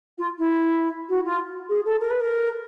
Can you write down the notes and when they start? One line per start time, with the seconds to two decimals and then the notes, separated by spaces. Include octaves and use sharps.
0.18 F4
0.38 E4
1.09 F#4
1.25 F4
1.69 G#4
1.85 A4
2.00 A#4
2.10 B4
2.20 A#4